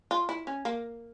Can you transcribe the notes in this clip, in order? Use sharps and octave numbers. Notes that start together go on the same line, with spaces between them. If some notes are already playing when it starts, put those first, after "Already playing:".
F4
E4
C#4
A#3